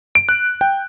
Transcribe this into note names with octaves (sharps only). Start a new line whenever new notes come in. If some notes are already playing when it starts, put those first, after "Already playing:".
D7
F#6
G5